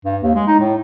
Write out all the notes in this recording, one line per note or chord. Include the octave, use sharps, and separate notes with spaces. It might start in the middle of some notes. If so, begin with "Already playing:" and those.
G2
D#2
G#3
D#4
A2